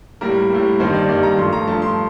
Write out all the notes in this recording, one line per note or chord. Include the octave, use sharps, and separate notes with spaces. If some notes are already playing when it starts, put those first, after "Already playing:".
A2 G3 A#3 A#4
A2 G3 A#3
G2 D#3 G3 A#3 C5
D5
G2 D#3 G3 A#3 D5
A#5
G2 F3 A3 C6
A#5
G2 F3 A3 A5
C6